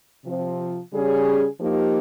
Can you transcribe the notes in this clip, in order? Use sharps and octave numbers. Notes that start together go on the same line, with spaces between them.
C3 F3 C4
C#3 G3 C#4 G#4
F3 A#3 D#4 G4